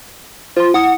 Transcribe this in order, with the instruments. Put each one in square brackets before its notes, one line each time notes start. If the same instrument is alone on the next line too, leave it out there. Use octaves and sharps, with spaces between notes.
[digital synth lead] F4 [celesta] C5 C6
[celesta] E4 D#6 [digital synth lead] F#5